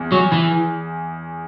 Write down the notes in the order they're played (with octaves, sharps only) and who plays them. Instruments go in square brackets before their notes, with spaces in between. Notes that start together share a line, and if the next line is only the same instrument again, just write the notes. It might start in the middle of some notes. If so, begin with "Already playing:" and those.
Already playing: [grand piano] E2
[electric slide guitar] F#3
E3